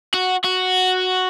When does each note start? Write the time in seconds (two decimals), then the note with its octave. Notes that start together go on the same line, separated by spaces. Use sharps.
0.14 F#4
0.45 F#4